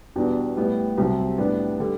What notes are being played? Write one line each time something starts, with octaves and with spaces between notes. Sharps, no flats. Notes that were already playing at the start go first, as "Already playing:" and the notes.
E2 B2 G3 D4
A1 A2 G3 B3
C2 C3 F#3 C4
A2 G3 B3 D4
D3 G3